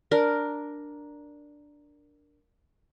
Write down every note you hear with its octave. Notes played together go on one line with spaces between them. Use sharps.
D4 A#4